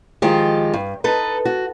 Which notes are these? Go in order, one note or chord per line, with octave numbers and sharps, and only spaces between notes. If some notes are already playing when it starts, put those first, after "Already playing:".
D#3 F3 G#3 F4 G4
G2
D#4 A4 B4
F#4